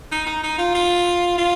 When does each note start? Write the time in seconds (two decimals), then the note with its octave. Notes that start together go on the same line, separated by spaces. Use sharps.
0.12 D#4
0.27 D#4
0.44 D#4
0.58 F4
0.75 F4
1.38 F4